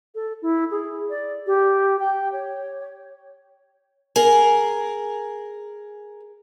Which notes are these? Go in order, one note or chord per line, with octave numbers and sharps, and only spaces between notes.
A4
E4
G#4
D5
G4
G5
C#5
G#4 A#4